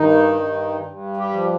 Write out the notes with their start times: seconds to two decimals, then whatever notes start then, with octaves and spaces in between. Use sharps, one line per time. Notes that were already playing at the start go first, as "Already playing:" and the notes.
Already playing: G2 D#3 D#4
0.40 G2
0.86 G2
1.17 G3 G4
1.33 F3